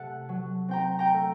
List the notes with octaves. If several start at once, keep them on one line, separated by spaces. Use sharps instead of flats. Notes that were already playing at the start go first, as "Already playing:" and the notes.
Already playing: C3 A3 F#5 A5
F#3
C4 G5 A#5
G5 A#5
A3